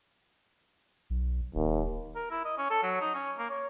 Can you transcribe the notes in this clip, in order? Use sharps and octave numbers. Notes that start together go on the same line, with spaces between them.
B1
D1 D#2
A#4
E4
D#5
C#4
A4
F#3
D#4
C#4
A#3
C#5